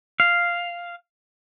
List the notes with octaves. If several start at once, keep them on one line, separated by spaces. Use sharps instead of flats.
F5